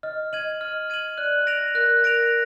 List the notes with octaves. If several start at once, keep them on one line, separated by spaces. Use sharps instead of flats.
D#5 F6
D#5 G#6 D#7 F#7
D#5 F6
G#6 D#7 F#7
D5 F#6
A#6 D7 F7
A#4 F#6
A#4 A#6 D7 F7